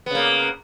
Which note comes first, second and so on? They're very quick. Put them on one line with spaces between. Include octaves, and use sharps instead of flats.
B3 C#3 A#3